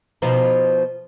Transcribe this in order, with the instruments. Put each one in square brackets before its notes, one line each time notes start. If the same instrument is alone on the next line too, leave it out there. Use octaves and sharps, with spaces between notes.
[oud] B2 F3 D#4